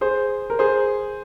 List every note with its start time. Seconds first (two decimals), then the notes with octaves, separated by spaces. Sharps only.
0.01 G#4 C5
0.50 A#4
0.59 G#4 C5